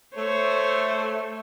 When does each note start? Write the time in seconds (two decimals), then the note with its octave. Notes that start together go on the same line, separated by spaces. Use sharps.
0.16 A3 C5 C#5